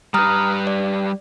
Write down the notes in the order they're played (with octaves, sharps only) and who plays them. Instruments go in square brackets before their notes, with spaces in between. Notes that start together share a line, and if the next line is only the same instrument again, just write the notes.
[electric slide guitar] G3 B4 [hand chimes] A#5 D#6 F6
[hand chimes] D5